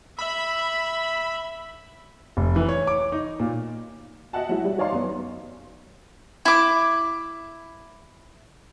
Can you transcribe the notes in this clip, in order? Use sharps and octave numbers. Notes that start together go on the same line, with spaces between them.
E5 B5
F1
E3
C#5
D6
D#4
A#2
F#4 D#5 E5 F#5 A5
F#3 G#3 E4 G#4
G3
D#4 C#5 D5 F5 A#5 C6
F#2 B3
E4 D6